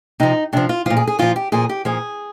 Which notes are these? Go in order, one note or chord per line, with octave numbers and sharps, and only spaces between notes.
C3 F3 D#4
C3 F3 D4
F4
A#2 F3 F4
G#4
G#4
A#2 F3 F4
G4
A#2 F3 G#4
G4
A#2 F3 G#4